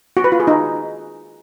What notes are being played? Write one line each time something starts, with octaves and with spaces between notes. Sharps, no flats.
F#4
B4
F4
G#4
D#4